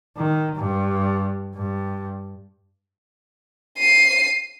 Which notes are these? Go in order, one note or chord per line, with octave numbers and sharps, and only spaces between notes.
D#3
G2
G2
C7 D#7